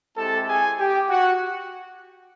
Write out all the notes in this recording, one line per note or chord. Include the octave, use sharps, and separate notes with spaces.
G#3 C4 E4 G4 A4 A5
G#4 G#5
G4 G5
F#4 F#5